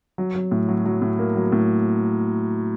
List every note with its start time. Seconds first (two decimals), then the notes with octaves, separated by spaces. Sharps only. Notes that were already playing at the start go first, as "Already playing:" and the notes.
0.18 F#3
0.35 F#3
0.51 A2
0.69 F#3
0.86 F#3
1.02 A2
1.19 A#3
1.35 F#3
1.52 A2